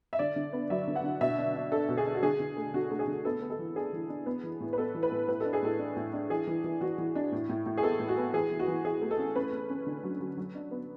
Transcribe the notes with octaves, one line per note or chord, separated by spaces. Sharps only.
E5
D3 D5
D3
B3
F#3 E5
D3
F#5
D3
B2 E5
D4
D4
D4 A4
B2
G#4
D4
F#4
D3 G#4
D3
A3
D3 F#4
A3
G#4
D3
B3 A4
B3
A4
E3
D4 G#4
E3
D4
B3
E3
A2
B4
B3 A4
E3
B4
A2
A2 B4
D4 A4
G#4
A2 A4
D4
A2
D4
E3 G#4
E3
E3
E3 F#4
E3
D4
A2
A2
A2
G#4
B3 A4
A2
F#4
B3
E3 G#4
E3
F#4
E3
E3 G#4
A3
A4
C#4
C#4 B4
C#4
C#4
D3
F#3
F#3
F#3
D4
B3